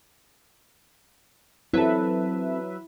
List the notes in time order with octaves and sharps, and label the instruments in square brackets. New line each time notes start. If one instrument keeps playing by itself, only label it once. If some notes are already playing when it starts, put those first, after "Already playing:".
[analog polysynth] F#3 B4 E5 [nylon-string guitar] C4 A4 [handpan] E4